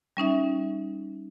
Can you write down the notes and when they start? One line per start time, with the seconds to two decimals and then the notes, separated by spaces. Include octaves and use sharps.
0.17 G3 C#4 D#4 E5